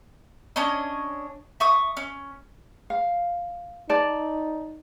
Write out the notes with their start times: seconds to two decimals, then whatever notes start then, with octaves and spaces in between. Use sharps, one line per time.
0.56 C#4 D4 C#5 D#5
1.60 E5 C#6 D#6
1.97 C#4
2.90 F5
3.89 D#4 D5 A5